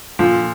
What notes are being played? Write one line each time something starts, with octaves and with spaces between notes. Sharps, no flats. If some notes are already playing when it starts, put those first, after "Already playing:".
A#2 D3 F3